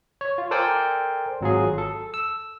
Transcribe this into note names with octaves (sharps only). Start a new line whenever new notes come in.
C#5
F4
A4 A#4 C5 D5 G5 G#5
G#1 F#3 F4 G#4
A4
E6